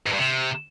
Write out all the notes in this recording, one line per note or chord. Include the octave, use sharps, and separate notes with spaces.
G#2
G2
C3